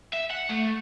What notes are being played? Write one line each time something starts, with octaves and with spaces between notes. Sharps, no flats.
E5
F#5
A3